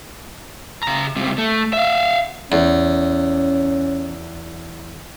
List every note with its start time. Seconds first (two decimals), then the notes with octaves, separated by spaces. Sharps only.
0.83 C#3 A#5
1.16 C#2 C3
1.38 A3
1.73 E5 F5
2.52 E2 C#4